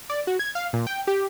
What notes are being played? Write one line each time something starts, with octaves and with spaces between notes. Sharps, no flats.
D5
F#4
G#6
F5
A#2
G5
G4